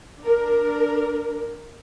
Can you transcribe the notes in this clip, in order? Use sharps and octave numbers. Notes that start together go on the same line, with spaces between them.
D4 A#4